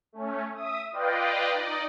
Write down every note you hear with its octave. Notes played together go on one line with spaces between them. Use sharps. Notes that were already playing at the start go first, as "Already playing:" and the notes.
A3 C#4
E5 D#6
F4 B4 D5 D#5 F5 G5
D#4 D5 D#5